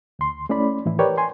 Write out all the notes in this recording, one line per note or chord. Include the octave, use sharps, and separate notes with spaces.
D2 C6
A3 C#4 E4 D5 B5
A2 E3 E4
G4 A#4 B4 C#5 D5 G5
G#5 C6